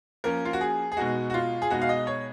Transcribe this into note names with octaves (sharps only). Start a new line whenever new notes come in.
F3 A#3 C#4 A#4
F4
F#4
G#4
G#4
B2 G#3 D#4 F#4
F#4
F4
G#4
B2 G#3 D#4 F#4
F5
D#5
C#5